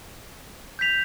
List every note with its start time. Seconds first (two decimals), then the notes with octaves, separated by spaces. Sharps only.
0.79 G6 B6 F7